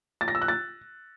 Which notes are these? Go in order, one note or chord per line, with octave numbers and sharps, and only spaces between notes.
A6
A#6
E6
F#6
A6